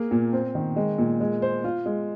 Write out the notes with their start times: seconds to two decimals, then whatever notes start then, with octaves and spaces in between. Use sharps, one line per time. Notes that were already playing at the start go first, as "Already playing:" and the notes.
Already playing: A#3 G#4
0.11 A#2
0.33 C4
0.55 D#3
0.76 G#3
0.98 A#2
1.20 G#3
1.42 C5
1.64 F4
1.86 G#3